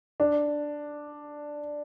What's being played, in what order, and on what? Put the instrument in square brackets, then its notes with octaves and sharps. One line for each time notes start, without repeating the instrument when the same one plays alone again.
[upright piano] D4